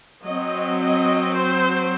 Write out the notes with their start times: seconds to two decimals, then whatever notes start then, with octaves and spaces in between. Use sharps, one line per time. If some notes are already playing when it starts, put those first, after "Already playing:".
0.25 F#3 C4 D#5
0.81 D#5
1.36 C5